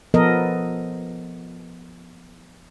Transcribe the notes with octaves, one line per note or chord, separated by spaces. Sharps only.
F3 B3 A4 A#4 D#5